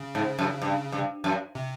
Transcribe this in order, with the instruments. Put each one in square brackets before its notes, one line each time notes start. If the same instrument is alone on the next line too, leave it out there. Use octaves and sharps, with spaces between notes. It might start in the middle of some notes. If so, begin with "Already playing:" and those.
Already playing: [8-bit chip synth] C#3
[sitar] G#2
F#2
G2
G2
F#2
[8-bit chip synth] C3